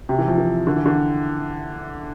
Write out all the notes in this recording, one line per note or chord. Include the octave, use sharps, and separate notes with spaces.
C3
E3
F3
E3
D3
E3
D3